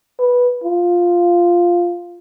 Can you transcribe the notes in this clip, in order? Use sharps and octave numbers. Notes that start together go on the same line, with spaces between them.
B4
F4